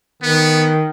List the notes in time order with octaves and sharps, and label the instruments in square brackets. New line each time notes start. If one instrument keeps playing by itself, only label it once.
[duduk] D#3 [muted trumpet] B3